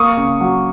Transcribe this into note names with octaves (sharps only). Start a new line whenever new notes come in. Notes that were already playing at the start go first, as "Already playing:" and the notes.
Already playing: A#3 C#6 D#6
C#3
F#3